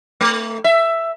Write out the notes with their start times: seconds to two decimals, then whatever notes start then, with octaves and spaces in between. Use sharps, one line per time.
0.21 A3
0.64 E5